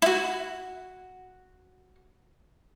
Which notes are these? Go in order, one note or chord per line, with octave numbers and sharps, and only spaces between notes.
E4 F#4